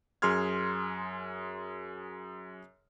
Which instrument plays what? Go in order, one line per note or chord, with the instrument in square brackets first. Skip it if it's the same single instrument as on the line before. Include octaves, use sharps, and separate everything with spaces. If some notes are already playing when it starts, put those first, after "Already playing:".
[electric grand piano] F#2 G#4 C6 F6 G#6